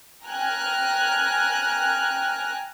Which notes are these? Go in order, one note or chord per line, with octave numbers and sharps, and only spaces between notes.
G5 G#5 A#5 F6 F#6